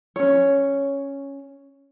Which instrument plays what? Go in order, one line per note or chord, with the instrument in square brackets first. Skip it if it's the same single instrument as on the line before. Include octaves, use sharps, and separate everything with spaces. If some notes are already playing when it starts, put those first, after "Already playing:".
[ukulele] C#4 C#5